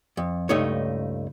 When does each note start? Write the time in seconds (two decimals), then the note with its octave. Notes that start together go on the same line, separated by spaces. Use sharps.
0.17 F2
0.49 C#2 G2 A3 D#4 C#5